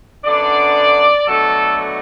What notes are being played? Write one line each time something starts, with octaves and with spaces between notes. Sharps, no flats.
F#2 D3 B3 D4 D5
B2 F#3 A3 D4 A4